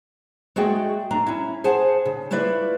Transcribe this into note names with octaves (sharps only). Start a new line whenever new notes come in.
G#3 A3 F#4 G#4 D5 G5
A3 D4 A#5
C#4 E4
G#4 C5 F#5 G#5 A5
C#3
A3 E4 F4 B4 D5 E5